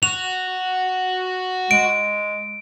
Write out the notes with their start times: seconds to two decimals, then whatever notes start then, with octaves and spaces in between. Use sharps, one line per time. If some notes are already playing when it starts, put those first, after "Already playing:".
0.03 F#4 F7
1.71 G#3 D7